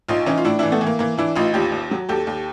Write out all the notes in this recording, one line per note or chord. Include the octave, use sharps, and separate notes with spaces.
A#1 D#4 F4
E3 C#4 D#4
F4
A2 D4 E4
E3 D4 E4
A3 B3
E3
A#3
E3 A#3
E3 D4 E4
A1 D#4 F4
D#2 F4 G4
D#2
F#3
D#2 G4 A4
D#2